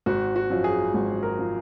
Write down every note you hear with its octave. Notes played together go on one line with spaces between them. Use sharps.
G#1 F#4
F#4
F#2 F3
G#4
G#1
A#4
F3